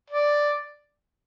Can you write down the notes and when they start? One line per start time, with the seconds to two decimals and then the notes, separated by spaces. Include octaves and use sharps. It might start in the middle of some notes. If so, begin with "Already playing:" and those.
0.10 D5